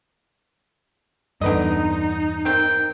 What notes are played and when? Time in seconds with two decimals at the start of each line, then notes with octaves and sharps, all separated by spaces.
1.41 E2 G2 D3 D#4 B4 D#5
2.45 D#3 C4 G5